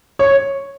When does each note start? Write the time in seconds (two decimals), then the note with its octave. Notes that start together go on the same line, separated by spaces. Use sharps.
0.19 C#5